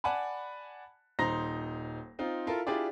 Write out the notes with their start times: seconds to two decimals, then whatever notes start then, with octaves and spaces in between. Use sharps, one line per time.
0.04 D5 F#5 G#5 A5 B5
1.19 D#1 D#4 C5 A#5 C6 A#6
2.19 C4 D#4 F4
2.47 E4 F4 A4 A#4
2.67 D4 E4 F4 G4 G#4 D5